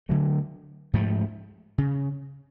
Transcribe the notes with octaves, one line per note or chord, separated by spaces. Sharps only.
D3 F#3 A3
G#2 F3 A3
C#3